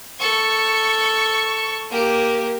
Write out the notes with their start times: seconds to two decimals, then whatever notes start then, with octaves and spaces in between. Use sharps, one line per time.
0.19 A4 C#6
1.91 A#3 G4